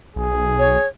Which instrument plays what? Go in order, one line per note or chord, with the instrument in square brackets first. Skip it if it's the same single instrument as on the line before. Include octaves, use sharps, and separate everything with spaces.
[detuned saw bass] B1 [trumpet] G#4
[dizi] C#5